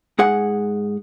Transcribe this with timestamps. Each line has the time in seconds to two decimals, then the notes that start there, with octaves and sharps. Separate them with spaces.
0.19 G#2 G#4 F#5